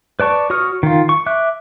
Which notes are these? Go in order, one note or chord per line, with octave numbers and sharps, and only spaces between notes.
B4 D5 A5 C#6
F#4 C#5 C#6 D#6 F6
D#3 F4
C#6
E5 D6 F#6